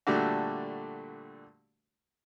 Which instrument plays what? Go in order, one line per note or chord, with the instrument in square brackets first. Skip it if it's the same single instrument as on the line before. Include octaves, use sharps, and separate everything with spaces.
[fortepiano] A#2 D3 G3 A3 D4 F#4